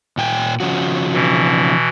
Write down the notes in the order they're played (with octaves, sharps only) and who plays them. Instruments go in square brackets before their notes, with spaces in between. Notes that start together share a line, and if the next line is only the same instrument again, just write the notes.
[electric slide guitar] A#2 G5 G#5
C#3 F3 F#4
[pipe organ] B2 E3